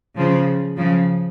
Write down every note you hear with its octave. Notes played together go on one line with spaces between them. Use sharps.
C#3 F3
C#3 F3